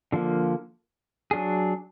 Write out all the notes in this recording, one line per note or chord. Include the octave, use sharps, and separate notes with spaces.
D3 F3 A#3
F#3 D4 G#4